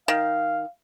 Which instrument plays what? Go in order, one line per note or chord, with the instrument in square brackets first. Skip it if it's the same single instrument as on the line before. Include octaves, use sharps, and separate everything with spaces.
[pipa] D#3 [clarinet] F5